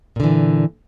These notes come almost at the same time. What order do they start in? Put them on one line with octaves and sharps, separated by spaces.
A#2 D3 E3